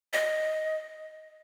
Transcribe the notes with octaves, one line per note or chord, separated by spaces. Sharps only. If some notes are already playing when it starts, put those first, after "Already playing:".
D#5